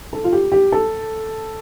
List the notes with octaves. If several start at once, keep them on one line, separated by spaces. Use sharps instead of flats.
A4
F4
G4
G4
A4